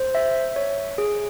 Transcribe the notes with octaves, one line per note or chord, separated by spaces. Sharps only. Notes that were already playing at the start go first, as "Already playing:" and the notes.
Already playing: C5
E5
C#5
G#4